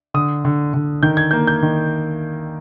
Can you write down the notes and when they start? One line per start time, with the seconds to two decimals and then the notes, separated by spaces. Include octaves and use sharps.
0.14 D3 D#6
0.45 D3
0.74 D3
1.03 D#3 G6
1.17 G#6
1.31 A#3 G6
1.47 G6
1.62 D#3